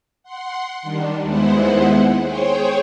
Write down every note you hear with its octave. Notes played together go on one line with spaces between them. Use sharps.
F#5 C6
D#3 G3 D4
D#2 G#3 B3 E4 C5 F#5
G#4 C5 C#5 G5